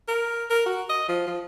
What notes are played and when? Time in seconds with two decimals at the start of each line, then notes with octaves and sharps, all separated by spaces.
0.08 A#4
0.50 A#4
0.66 F#4
0.89 D#5
1.08 F3
1.27 F3